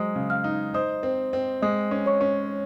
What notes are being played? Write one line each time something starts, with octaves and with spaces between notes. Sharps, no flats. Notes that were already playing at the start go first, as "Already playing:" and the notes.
Already playing: F#3 G#3 C5 D#5 D#6
C#3
F5 F6
D#4
C5 D#5 D#6
C4
C4
G#3 D#5 D#6
C#4
C#5 C#6
C#4